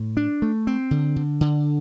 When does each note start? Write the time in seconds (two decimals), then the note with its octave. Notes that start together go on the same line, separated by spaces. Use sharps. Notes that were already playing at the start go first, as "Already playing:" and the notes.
Already playing: A2
0.17 D4
0.42 A3
0.67 C4
0.91 D3
1.16 D3
1.41 D3